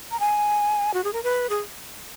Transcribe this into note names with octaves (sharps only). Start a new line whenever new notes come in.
A#5
G#5
F#4
G#4
A#4
B4
G#4